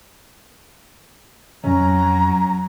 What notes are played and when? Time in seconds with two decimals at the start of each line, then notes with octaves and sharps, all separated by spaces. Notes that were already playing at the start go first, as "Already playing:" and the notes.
1.64 F2 F#3 C#4 A#5